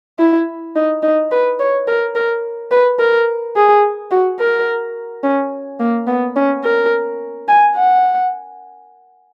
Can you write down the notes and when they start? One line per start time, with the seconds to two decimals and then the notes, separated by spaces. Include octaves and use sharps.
0.19 E4
0.76 D#4
1.03 D#4
1.32 B4
1.59 C#5
1.87 A#4
2.15 A#4
2.71 B4
2.99 A#4
3.56 G#4
4.11 F#4
4.39 A#4
5.24 C#4
5.80 A#3
6.07 B3
6.36 C#4
6.64 A#4
7.48 G#5
7.76 F#5